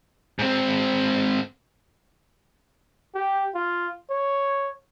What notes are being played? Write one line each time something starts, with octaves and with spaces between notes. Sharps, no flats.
G#2 C4
G4
F4
C#5